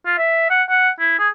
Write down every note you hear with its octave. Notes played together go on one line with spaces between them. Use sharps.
F4
E5
F#5
F#5
E4
G#4